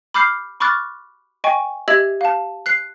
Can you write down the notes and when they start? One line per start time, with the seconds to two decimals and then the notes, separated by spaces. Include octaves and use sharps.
0.14 B5 D6 F6 G6 C7
0.60 B5 C#6 D6 F6 F#6 A6
1.44 D#5 G5 G#5 C#6
1.88 G4 D#5 E5 E6 G#6 F#7
2.21 F5 A5
2.66 F#6 C7